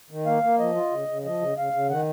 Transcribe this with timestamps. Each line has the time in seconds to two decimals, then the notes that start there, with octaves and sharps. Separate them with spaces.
0.11 D#3
0.26 A#3 F5
0.43 A#3
0.59 F3 D#5
0.75 F4
0.91 C#3
1.08 C#3
1.24 F3 D#5
1.41 C#3
1.57 C#3 F5
1.73 C#3
1.90 D#3 F#5